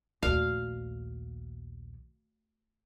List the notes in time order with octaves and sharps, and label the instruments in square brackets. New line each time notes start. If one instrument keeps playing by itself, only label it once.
[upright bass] A#1 D#2 [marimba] A3 F#4 D5 [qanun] F5